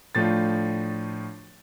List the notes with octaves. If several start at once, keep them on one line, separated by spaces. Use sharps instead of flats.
A2 F3 A3 D4 F4 A6